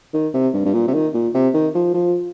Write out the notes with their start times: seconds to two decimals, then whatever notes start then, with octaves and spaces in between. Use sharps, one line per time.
0.14 D#3
0.34 C3
0.53 G2
0.65 G2
0.73 A#2
0.87 C3
0.94 D#3
1.14 A#2
1.34 C3
1.54 D#3
1.75 F3
1.94 F3